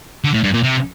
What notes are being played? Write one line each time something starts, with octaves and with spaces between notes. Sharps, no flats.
D3
A2
G2
A#2
C3